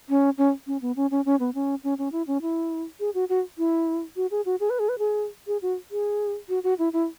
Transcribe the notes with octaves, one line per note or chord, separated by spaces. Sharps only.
C#4
C#4
C#4
B3
C#4
C#4
C#4
B3
C#4
C#4
C#4
E4
C#4
E4
G#4
F#4
F#4
E4
F#4
G#4
F#4
G#4
B4
G#4
B4
G#4
G#4
F#4
G#4
F#4
F#4
E4
E4